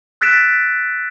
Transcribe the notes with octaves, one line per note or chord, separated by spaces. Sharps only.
E6 F#6 A6 B6 D7 E7